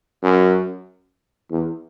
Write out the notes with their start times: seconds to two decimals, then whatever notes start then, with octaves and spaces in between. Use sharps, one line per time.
0.23 F#2
1.50 E2